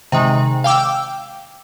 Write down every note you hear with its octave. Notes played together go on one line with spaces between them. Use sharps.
C3 D#3 G#3
F5 G5 D6 E6